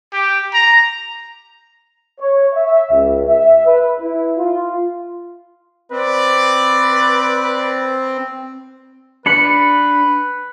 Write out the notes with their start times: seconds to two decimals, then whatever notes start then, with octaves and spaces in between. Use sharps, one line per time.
0.13 G4
0.53 A#5
2.20 C#5
2.54 E5
2.92 C#2
3.28 E5
3.66 B4
4.00 E4
4.38 F4
5.92 C4 B4 D5
9.26 D4 B4 B5 C#7